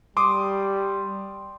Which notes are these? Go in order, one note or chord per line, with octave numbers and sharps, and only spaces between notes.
G3 C6 D6 D#6